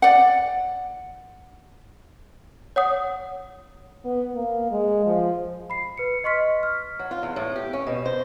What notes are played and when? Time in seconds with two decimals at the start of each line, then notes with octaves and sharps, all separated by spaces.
0.02 D5 F#5
2.76 C#5 F#5 D#6
4.05 B3
4.35 A#3
4.71 G#3
5.06 F3
5.70 B5 C7
5.97 B4 C#7
6.24 D#5 C6 C#6 F6 B6
6.63 F6
6.99 F#3
7.11 F4
7.23 E2
7.36 A2
7.56 G4
7.73 C#4
7.87 B2
8.06 C5